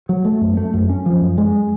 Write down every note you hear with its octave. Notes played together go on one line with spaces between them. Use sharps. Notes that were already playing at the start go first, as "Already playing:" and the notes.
F#3
A3
F#2
A3
F#2
C#4
F3
F#2
G#3